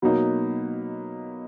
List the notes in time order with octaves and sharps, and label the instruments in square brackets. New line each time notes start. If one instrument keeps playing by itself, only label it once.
[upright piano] B2 F#3 A#3 D#4